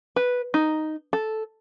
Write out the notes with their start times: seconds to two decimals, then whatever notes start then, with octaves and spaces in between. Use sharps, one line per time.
0.16 B4
0.54 D#4
1.13 A4